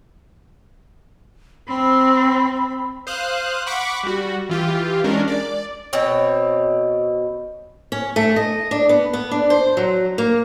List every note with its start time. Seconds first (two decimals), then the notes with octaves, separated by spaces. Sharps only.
1.68 C4 B5
3.07 C5 F5 D#6 F#6
3.66 F#5 B5 C#6 D6 B6
4.03 G3 F#4
4.49 E3 F4 G4
5.04 G#3 C#4 D4 A#4
5.28 D5
5.93 B2 C4 C#5
7.92 C#4
8.16 A3
8.36 D#5
8.71 D4
8.89 B3
9.13 B3
9.31 D4
9.50 C5
9.77 F#3
10.18 A#3